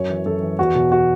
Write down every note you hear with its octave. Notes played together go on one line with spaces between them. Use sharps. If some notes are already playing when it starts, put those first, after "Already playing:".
Already playing: F#2 C#5
E3
F#2 A4
E3
E2 F#4
B2
F#4